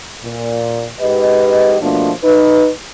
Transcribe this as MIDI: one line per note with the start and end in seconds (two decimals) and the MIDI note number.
0.23 0.89 46
0.99 1.75 44
0.99 1.75 67
0.99 1.75 71
0.99 1.75 75
1.81 2.11 47
1.81 2.11 53
1.81 2.11 57
1.81 2.11 58
1.81 2.11 62
2.22 2.68 63
2.22 2.68 71